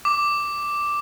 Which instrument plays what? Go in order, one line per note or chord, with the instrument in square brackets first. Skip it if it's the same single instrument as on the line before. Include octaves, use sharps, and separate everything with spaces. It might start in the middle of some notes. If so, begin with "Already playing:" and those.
[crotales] D6